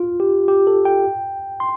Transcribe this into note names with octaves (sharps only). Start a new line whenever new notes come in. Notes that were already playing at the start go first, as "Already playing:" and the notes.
Already playing: F4
G4
G4
A4
G5
C6